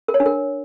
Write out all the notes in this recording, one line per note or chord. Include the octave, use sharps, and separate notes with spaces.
A#4
C#5
D4
A#4